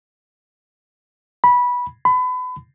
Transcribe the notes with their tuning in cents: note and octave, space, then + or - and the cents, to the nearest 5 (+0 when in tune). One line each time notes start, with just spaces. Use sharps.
B5 -15
B5 +30